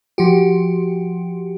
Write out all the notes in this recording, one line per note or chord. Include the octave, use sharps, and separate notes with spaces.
F3 F#4 G4